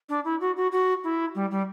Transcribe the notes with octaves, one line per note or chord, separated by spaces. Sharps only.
D4
E4
F#4
F#4
F#4
E4
G3
G3